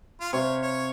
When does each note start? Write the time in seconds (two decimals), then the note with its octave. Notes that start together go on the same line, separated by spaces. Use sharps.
0.21 F4
0.33 C3 C#5 F5
0.62 C#5